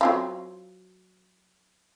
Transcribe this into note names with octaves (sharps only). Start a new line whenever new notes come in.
F#3 C4 F4